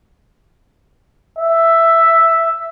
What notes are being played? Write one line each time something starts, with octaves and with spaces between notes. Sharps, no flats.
E5